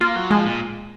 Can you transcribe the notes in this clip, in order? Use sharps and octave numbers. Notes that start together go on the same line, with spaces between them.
A#3 F4
F#3
F3 G#3
A#2